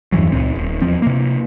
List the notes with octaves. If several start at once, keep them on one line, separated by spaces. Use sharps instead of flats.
E2 G2 E3 F#3
C#2 A#2 C4
D#1
E2 F3 C4
C3 A#3